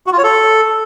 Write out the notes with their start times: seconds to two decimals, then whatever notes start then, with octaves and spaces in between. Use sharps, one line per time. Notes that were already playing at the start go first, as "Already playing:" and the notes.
0.07 F#4
0.12 F4
0.18 C#5
0.24 A4